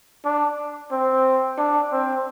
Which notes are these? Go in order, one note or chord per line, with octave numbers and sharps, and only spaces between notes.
D4
C4
D4
C4